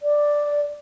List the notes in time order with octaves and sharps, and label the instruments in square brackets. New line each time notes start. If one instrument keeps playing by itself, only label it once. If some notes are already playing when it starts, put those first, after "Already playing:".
[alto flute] D5